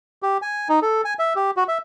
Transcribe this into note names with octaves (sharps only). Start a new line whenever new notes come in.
G4
G#5
D#4
A4
G#5
E5
G4
F#4
E5